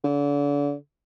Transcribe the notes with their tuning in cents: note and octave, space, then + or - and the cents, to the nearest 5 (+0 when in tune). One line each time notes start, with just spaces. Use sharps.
D3 -35